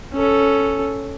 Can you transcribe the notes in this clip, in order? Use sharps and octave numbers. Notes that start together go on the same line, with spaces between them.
C#4 A4